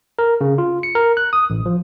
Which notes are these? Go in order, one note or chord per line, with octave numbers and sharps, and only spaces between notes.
A#4
C#3
F4
C#7
A#4
F#6
D#6
A1
F3